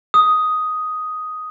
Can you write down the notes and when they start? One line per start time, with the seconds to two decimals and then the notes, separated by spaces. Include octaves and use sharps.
0.14 D#6